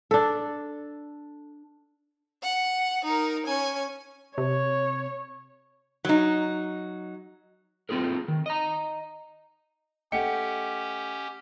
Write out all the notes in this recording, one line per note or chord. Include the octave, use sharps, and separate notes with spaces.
D4 A4
F#5
D#4 A#4
C#4 G#5
C3 C#5
F#3 D#4
A3 C4 F4 G#4 A#4
D#3
D#5 A#5
A3 C#4 G4 D#5 F#5 G5 C#7